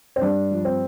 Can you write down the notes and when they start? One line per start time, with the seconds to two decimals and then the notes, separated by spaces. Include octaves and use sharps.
0.16 C4
0.21 G2 D4
0.51 F3
0.65 C4